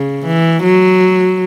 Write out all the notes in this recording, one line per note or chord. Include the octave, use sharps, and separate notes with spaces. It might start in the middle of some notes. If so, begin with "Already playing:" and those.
Already playing: C#3
E3
F#3